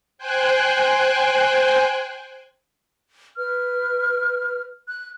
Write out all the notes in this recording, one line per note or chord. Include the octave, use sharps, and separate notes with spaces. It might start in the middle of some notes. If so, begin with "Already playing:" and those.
C5 G5 G#5 F#6
B4 F6
F#6